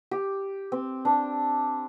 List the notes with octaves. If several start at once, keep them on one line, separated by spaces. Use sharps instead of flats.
G4
C4
D4